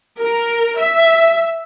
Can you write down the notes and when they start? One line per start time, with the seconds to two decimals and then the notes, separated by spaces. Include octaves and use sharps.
0.21 A#4
0.79 E5